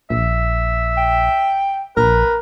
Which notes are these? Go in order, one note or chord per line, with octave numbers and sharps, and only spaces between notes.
A#1 E5
G5
A#1 A#4 B4